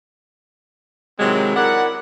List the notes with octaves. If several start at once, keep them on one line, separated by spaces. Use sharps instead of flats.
C3 D#3 F#3 G#3 C4 E4
E4 A#4 D5 F#5